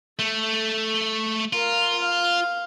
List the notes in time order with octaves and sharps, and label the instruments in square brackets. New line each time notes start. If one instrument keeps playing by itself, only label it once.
[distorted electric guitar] A3 [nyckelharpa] A4
[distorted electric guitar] F4 [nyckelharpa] A#4 F5
[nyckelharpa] F5